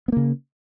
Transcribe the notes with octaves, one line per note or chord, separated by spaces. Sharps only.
C#3 A#3 B3